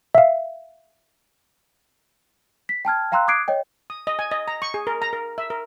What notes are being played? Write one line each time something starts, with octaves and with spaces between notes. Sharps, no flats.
E5 F5
B6
G5 A5 F6 G#6
F5 G5 A#5 C6 E6 F#6
D6 D#6 F#6 G#6 C7 D7
C#5 D#5 G5
D#6
D#5
G#5
D#5
A#5
C#6
G#4
A#4
A#5
A#4
E5
A#4